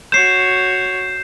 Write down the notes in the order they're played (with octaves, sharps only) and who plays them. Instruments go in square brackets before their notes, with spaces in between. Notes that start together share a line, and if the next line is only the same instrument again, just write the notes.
[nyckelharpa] F#4 C#5 [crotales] G6 [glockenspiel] C7 E7